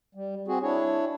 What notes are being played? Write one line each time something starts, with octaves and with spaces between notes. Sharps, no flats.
G3
C4 F#4 G#4
D4 E4 C#5